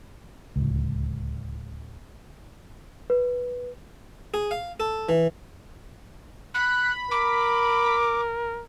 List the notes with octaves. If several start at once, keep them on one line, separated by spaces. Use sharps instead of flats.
D1 C#2
B4
G#4
F5
A4
E3
B5 F#6
A#4 D6